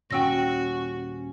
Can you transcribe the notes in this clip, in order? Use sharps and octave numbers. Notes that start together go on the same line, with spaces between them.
D#1 C#4 F#4 G5 E6 A#6